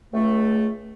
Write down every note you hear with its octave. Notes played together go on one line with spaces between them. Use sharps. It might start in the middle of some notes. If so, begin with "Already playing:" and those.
C#2 A3